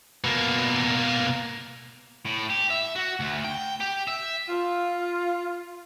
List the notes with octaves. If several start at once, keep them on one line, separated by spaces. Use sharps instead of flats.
B2 A#3
A2
G4
E5
F#4
D2
G5
G4
E5
F4